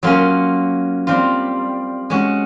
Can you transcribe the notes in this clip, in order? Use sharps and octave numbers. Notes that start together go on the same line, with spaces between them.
F#3 A#3 C#4 F4
G3 C4 F4
G#3 C#4 F#4